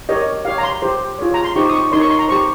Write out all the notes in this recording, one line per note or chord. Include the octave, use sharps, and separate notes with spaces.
G4 A#4 C#5 D#5
G4 C#5 F5
A#5
C6
G4 C5
F4 G#4 C#5
A#5
C6
D#4 G4 C5 C#6
D#6
C#6
D#4 A#4 C#5 C6
C#6
C6
A#5
G4 C5 C#6